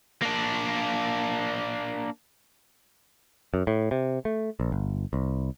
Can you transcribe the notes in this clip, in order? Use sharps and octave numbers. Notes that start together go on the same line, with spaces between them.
A#3 D4
F#2
A2
C3
A3
A#1
G1
C2